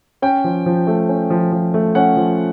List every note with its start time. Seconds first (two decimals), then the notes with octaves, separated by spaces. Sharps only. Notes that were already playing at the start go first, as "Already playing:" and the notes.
0.22 C#4 G5
0.44 F3
0.66 F3
0.87 A3
1.09 C#4
1.30 F3
1.52 F3
1.74 A3
1.95 C#4 F#5
2.17 F3